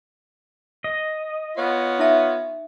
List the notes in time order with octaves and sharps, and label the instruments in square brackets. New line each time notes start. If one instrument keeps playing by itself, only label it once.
[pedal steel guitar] D#5
[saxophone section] B3 F4 C#5
[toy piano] D#4 E5 A5